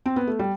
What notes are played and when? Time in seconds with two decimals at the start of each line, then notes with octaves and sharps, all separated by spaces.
0.06 C4
0.16 B3
0.27 A3
0.39 G3